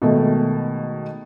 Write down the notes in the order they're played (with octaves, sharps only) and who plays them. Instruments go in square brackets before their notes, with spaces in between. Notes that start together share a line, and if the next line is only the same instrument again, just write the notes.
[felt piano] B2 D#3 G#3 A3 A4